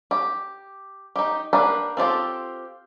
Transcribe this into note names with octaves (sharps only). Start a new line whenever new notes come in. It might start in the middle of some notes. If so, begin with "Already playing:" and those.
G4
D#4 G4
A#3 D4 G4 A#4 B4
C4 F4 G4 A4